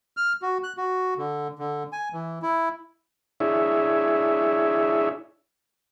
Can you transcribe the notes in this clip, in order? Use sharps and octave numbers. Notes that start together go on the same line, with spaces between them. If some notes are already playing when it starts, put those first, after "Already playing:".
F6
F#4
F#6
F#4
D3
D3
G#5
E3
E4
D4 E4 G#4 C#5 E5